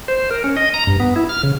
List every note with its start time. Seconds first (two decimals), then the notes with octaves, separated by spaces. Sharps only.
0.08 C5
0.31 A#4
0.44 C#4
0.57 D#5
0.74 A#5
0.87 G2
1.00 B3
1.16 E4
1.29 F6
1.43 C#3